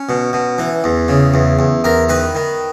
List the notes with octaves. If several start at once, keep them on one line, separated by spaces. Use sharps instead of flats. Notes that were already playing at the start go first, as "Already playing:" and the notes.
Already playing: C#4
B2
B2
E3
E2
C#3
E2
E2
E2 A#4
D#3 B4
D#3